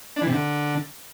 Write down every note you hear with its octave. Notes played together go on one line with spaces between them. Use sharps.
D4
E3
C3
D3